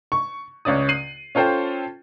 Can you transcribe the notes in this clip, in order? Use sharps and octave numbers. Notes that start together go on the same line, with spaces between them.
C#6
C#2 C#4 D5 D#6
C7 D#7 F#7
C#4 F4 A4 C5 G5